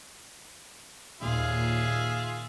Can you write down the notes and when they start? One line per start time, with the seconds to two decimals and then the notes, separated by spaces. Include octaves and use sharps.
1.21 D#2 A#2 F4 G#4 E5